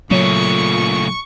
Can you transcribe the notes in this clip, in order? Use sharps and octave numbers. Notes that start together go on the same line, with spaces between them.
A#2 C#3 F#3 A3 C#6